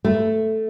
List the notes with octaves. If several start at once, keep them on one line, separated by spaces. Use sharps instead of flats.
A3